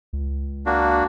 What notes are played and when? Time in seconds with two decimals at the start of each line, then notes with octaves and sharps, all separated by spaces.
0.13 C#2
0.66 A#3 D4 F#4